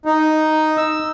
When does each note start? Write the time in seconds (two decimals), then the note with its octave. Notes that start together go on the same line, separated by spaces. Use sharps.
0.05 D#4
0.77 E6